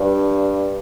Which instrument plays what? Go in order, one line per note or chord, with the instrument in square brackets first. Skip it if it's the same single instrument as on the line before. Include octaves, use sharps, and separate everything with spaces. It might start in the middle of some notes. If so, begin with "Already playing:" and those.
Already playing: [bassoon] G2